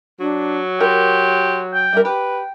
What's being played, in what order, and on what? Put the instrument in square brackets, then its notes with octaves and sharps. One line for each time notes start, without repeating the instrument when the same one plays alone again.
[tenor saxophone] F#3 [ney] D4
[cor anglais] G4 [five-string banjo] A#4 [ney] C6
[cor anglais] G5
[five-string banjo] G3 A#4 [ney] E5
[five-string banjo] G4 [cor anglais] B4 [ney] G5